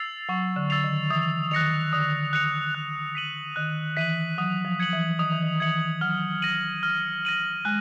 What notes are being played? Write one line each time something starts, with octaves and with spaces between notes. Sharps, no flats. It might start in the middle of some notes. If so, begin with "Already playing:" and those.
Already playing: E6 A6 C7 F7
F#3 C#6
D3
E6 A6 C7 F7
D#3
E3 D#6
D#3 F#6 A#6 C#7 F7
D3 D#6
F#6 A#6 C#7 F7
F#6
B6 D#7 F#7
D#3 F#6
E3 B6 D#7 F#7
F#3 D#6
F3
G#6 C#7 F#7
E3
D#3 D#6
E3
D#3
E3 G#6 C#7 F#7
F#3 F6
A#6 D#7 F#7
F6
A#6 D#7 F#7
G#3 F#6